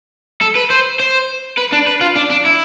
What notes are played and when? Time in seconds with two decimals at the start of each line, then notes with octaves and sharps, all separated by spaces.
0.41 A4
0.55 B4
0.70 C5
0.99 C5
1.58 B4
1.73 D4
1.87 B4
2.01 F4
2.16 D4
2.30 D4
2.45 E4